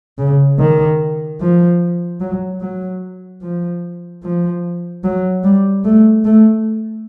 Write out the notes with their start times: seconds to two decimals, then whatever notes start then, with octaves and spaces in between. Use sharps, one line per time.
0.18 C#3
0.59 D#3
1.40 F3
2.21 F#3
2.61 F#3
3.42 F3
4.23 F3
5.04 F#3
5.44 G3
5.84 A3
6.25 A3